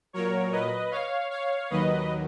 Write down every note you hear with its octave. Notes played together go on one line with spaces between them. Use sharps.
A#2 F#3 A#4 C#5
B4 D#5
C#5 F5
C#5 F5
D#2 D#3 F#3 B4 D#5